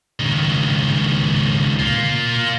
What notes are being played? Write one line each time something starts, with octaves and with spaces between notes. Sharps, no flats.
C#2 D#3
A#3 F4